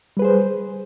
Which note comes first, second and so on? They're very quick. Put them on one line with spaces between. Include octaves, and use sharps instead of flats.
G3 B4 G#4 C5